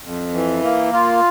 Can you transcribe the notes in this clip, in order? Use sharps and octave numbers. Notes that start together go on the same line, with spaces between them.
F2
E3
A#3
F4